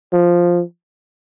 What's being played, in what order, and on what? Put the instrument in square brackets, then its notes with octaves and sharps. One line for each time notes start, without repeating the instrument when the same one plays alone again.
[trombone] F3